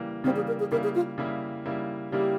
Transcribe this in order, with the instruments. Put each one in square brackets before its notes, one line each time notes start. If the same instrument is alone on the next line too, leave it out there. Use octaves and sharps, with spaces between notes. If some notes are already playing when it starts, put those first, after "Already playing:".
Already playing: [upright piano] C#3 E3 G3 A#3
[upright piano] C#3 E3 G3 A#3 [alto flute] C4
[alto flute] G#4
A#4
G#4
[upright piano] C#3 G3 A#3 E4 [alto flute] A#4
[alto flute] G#4
F4
[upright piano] C#3 G3 A#3 E4
C#3 G3 A#3 E4
[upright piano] C#3 G3 A#3 E4 [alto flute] G4